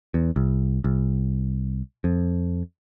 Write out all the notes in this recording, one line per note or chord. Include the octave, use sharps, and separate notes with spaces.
E2
C2
C2
F2